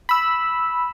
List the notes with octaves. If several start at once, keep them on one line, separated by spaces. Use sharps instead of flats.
B5 E6